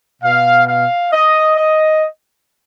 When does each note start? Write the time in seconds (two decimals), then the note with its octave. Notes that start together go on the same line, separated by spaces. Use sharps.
0.22 B2 F5
0.67 F5
1.12 D#5
1.57 D#5